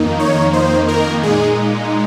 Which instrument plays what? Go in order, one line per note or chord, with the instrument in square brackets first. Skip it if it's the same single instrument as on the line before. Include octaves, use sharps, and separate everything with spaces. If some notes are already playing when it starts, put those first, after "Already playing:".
Already playing: [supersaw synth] F2 D#3 A#3 D#4
C#5
C5
A#4
A#2 G#3 D#4 G#4